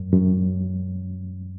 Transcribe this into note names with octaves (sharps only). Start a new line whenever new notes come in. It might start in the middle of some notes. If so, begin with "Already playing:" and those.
Already playing: F#2
F#2